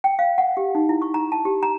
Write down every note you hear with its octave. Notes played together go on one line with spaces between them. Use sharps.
G5
F5
F#5
G4
D#4
E4
C#6
A#5
A5
G4
A#5